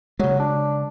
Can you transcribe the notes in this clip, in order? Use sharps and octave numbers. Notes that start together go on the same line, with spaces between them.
C#3 F#3 G#3
D4